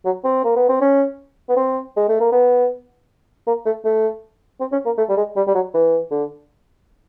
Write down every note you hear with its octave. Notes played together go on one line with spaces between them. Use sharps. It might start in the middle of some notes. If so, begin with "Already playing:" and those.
F#3
C4
A#3
B3
C4
C#4
B3
C4
G#3
A3
A#3
B3
A#3
A3
A3
C4
C#4
A#3
A3
G3
G#3
G3
G3
F#3
E3
D3